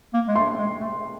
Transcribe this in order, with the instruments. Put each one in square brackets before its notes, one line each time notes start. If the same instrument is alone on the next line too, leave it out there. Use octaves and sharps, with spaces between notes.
[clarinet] A#3
G#3
[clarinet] A3 [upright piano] C6
[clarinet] G#3
A3